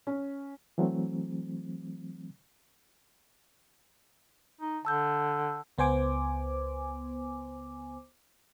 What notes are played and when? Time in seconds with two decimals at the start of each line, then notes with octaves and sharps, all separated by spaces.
0.07 C#4
0.78 E3 F#3 A3 C4
4.61 D#4
4.85 D3 A5 E6 G6
5.78 C#2 B3 C5 G#5 D6